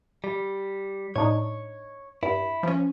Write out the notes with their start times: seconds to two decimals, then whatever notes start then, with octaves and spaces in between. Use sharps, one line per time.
0.24 G3
1.16 A2 D4 D#4 C#5
2.23 G2 E4
2.63 F3 C#4